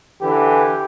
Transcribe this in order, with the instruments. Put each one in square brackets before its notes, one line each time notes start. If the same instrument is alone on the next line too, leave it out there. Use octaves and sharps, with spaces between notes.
[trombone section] D3 E3 [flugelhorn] G4